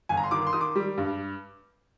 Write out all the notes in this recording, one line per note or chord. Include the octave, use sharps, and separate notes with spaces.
G1 G#5
A#5
C6
D#3 D6
C6
D#3 D#6
D6
G3
G2